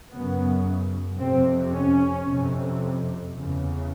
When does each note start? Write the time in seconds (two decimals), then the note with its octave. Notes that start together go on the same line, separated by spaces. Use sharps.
0.11 F#2 C#3 B3
1.19 F2 C3 C4
1.72 C#4
2.27 F2 C3
3.34 E2 C#3